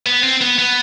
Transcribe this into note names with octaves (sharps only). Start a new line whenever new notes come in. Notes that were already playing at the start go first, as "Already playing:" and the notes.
B3
C4
B3
B3